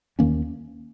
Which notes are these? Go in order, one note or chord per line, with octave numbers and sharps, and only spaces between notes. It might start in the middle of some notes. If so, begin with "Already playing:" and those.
D#2 D#3 A#3 C#4